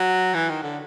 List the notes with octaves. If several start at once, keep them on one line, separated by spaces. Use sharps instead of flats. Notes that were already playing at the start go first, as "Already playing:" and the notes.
Already playing: F#3
E3
D#3
D3